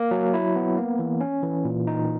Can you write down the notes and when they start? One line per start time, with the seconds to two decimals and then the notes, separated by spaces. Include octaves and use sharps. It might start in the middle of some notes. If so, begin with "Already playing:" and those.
Already playing: A#3
0.11 F#3
0.34 E4
0.56 B3
0.78 A#3
0.99 E3
1.21 C#4
1.43 E3
1.65 A#2
1.87 D#4